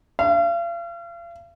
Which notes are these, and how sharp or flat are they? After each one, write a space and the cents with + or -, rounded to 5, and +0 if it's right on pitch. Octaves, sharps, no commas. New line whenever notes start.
F5 -40